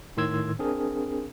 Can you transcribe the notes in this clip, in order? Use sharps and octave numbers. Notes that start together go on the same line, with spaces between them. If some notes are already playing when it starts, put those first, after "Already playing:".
A2 D#3 C6 E6 G#6
C4 D4 G#4 A#4